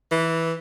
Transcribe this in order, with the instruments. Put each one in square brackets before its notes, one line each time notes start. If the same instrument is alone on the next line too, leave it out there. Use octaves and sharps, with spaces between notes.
[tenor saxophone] E3